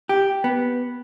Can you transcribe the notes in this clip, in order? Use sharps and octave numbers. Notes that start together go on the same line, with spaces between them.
G4
B3